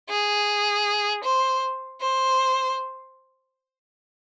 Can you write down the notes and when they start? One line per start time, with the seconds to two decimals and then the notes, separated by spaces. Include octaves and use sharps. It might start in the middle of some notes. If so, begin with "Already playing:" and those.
0.09 G#4
1.24 C5
2.01 C5